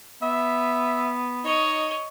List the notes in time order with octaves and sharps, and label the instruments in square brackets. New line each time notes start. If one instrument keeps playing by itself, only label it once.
[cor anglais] B3 [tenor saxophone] E5
[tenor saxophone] D#4 [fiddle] C#5 D#5